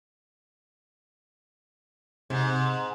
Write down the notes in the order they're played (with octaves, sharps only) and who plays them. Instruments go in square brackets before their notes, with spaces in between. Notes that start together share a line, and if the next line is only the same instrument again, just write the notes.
[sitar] G#2 [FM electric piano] C3